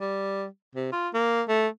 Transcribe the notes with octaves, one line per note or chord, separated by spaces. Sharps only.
G3
C3
F4
A#3
A3